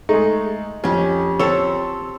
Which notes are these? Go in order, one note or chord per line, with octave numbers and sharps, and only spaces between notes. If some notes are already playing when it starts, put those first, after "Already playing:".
G#3 A3 D#4
F2 C#4 G4
C4 A4 C#5 A5